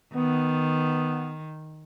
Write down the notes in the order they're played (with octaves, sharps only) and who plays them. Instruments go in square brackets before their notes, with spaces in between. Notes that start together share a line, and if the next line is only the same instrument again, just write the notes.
[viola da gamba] D#3 [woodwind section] B3